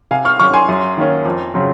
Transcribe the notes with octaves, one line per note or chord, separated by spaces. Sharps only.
C3 F5 G#5
C#6 F6
F#3 C#4 C#6 F6
G#5 C6
F#2
D#3 A#3 C#4
F2
C#3 F#3 C4